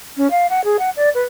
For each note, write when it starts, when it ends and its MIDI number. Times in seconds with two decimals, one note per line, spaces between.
0.17 0.30 61
0.31 0.46 77
0.50 0.64 78
0.64 0.77 68
0.79 0.90 78
0.97 1.09 74
1.14 1.22 71